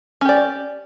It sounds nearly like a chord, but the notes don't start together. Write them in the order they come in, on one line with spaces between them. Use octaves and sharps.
C#4 G4 D5